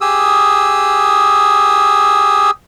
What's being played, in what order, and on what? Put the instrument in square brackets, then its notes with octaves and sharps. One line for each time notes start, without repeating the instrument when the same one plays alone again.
[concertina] G4 G#4 D#6 E6